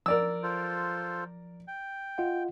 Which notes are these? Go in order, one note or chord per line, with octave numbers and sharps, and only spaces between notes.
F3 A#4 D5 E6
F4 A4 C5
G5
F4 D#5 F#5